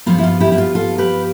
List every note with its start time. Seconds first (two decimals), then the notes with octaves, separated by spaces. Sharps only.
0.06 G2 F3 B3 F4
0.18 E4
0.24 F4
0.40 E4 G4
0.52 E4
0.58 F4
0.75 F4 A4
0.98 G4 B4